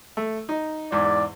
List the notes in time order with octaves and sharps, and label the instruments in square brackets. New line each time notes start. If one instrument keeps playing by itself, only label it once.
[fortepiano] A3
D#4
[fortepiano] E2 G#2 [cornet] D5